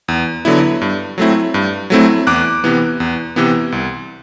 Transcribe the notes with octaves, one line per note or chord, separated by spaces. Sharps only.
E2
D3 F#3 B3 E4
G2
F#3 A3 C4 E4
G2
F#3 A3 C4 E4
E2 D6 F#6
C3 E3 B3
E2
C3 E3 B3
C2